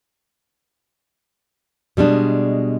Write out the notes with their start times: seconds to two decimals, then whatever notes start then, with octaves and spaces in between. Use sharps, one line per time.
1.97 B2 G3 G#3 D4